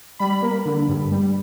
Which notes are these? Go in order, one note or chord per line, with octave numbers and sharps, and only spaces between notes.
G3 B5
A#3
D3
G2
G3